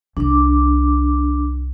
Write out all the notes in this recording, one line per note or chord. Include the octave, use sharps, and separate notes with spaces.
C2 D4 D6